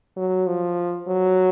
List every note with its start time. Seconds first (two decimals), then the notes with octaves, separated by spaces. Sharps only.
0.16 F#3
0.47 F3
1.08 F#3